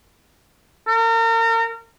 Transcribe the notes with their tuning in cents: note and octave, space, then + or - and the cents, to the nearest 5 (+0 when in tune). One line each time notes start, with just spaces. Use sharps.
A#4 -35